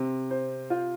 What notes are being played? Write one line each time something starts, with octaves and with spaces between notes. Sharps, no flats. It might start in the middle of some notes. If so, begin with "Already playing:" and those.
Already playing: C3 C4
C5
F4